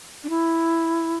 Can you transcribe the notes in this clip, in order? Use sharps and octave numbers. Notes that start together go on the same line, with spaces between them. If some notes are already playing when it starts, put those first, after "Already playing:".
D4
E4